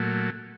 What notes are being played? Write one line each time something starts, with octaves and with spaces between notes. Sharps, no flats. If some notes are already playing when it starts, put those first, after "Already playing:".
Already playing: A#2 F#3 A3